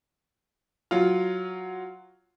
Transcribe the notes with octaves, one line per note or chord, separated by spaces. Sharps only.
F#3 F4